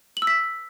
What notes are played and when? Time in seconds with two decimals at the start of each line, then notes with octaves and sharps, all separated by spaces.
0.17 F#7
0.22 E6
0.27 B6